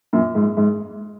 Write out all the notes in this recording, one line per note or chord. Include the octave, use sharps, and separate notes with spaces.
F#2 A#2
G#2
G#2